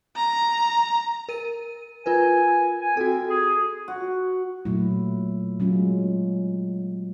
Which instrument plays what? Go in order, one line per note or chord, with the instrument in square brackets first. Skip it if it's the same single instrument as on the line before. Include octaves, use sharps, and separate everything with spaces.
[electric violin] A#5
[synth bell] A#4 D#7
[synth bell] F4 A#4 B4 [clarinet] G#5
[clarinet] G#5
[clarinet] C4 [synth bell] F#4 A4
[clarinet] G#4
[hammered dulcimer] F#4
[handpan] A#2 F#3 A3 E4
F#3 G#3 C#4 F4